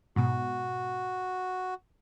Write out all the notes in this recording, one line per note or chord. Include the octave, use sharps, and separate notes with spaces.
G#2 B2 F#4